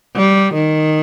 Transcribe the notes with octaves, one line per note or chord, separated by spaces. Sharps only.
G3
D#3